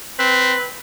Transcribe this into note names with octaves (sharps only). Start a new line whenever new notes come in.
C4 B4